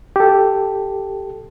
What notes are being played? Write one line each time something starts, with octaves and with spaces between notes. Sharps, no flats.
G4 A4